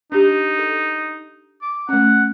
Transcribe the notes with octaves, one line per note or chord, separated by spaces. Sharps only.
D4 D#4 G4
A4
D6
A3 C#4 F#5